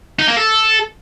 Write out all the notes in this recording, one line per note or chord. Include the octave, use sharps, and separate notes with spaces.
D#4
A#3
A4